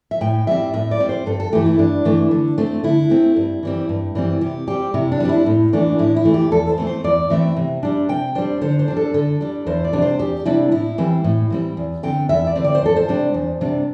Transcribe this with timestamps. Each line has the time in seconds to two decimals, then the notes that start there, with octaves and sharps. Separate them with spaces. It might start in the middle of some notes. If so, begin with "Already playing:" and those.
0.11 E5
0.21 A2 G5
0.47 G3 C4 E5
0.74 A2 E5
0.91 D5
1.00 G3 C4
1.09 C5
1.26 G2 A4
1.40 A4
1.53 E3 A3 G4
1.66 E4
1.79 G2 D4
2.05 E3 A3
2.31 D3
2.58 A3 C4
2.84 D3 E4
3.10 A3 C4
3.36 G2
3.63 E3 G3 C4
3.89 G2
4.15 E3 G3 C4
4.41 C3 G4
4.68 G3 C4 G4
4.94 C3 E4
5.12 D4
5.20 G3 C4 G4
5.29 E4
5.46 A2
5.73 E3 A3 D4
5.99 A2 E4
6.16 E4
6.25 E3 A3
6.34 G4
6.52 E2 A4
6.69 C5
6.78 E3 A3 C4
6.87 C5
7.04 E2 D5
7.30 E3 A3 C4 E5
7.56 C3
7.83 G3 D4
8.09 C3 G5
8.35 G3 D4 C5
8.61 D3 C5
8.79 C5
8.88 G3 D4
8.97 A4
9.14 D3 A4
9.41 G3 D4
9.67 E2 C5
9.84 D5
9.93 C3 G3 D4
10.02 C5
10.19 E2 G4
10.45 C3 G3 D4 E4
10.71 A2 E4
10.98 E3 G3 C4
11.24 A2
11.50 E3 G3 C4
11.77 E2
12.03 D3 C4 G5
12.29 E2 E5
12.47 D5
12.56 D3 C4
12.64 D5
12.75 C5
12.82 E2 A4
12.96 C5
13.08 C3 G3 D4
13.34 E2
13.61 C3 G3 D4